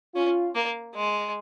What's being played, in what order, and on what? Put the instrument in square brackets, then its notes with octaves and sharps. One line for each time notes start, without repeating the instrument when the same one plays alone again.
[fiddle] C#4 [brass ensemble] F4
[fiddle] A#3
G#3